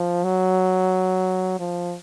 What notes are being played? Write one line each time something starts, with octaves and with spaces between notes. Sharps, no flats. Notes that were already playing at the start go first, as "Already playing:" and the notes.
Already playing: F3
F#3
F3